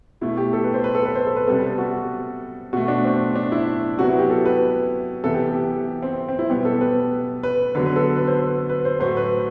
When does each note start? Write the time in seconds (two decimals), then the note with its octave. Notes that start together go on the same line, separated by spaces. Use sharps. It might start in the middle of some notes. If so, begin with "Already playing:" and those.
0.21 B2 A3 E4
0.37 G4
0.53 A4
0.64 B4
0.74 C5
0.84 B4
0.95 A4
1.05 B4
1.15 C5
1.26 A4
1.36 B4
1.47 C3 G3 B3 A4
1.78 F#4
2.73 B2 A3 F#4
2.88 D4
3.04 C4
3.35 D4
3.52 E4
3.98 C3 F#3 B3 F#4
4.09 E4
4.19 G4
4.30 A4
4.46 B4
5.24 C3 E3 B3 A4
5.34 G4
5.55 G4
6.02 C4
6.29 C4
6.39 E4
6.49 B2 G3 B3 G4
6.65 A4
6.81 B4
7.43 B4
7.75 D3 F#3 B3 B4
7.86 B4
7.96 A4
8.17 B4
8.27 C5
8.69 B4
8.85 C5
9.00 A2 F#3 A3 C5
9.17 B4